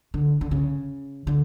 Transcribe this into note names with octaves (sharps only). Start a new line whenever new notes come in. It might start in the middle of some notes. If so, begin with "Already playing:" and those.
D3
D3
C#3
D3